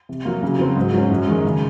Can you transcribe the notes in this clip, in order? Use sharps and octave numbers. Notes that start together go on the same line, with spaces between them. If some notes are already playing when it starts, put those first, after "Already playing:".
C3
F#3 A#3
C#3
F#3 C4
G#2
F#3 C#4
F#2
D#3 G#3
C#3